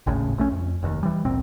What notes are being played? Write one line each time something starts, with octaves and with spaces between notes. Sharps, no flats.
G#1 D#2 A2 C#3
A#1 A3 C#4
F2
F1 D#2
E3 G3
G#1 D2 A#2 C4